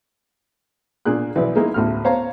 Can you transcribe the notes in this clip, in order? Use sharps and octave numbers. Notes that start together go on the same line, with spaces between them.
A#2 A#3 D4 G#4 F#6
B1 E3 B4 D5
G#3 A#3 D#4 E4
A1 D2 F6
C5 C#5 F5 A#5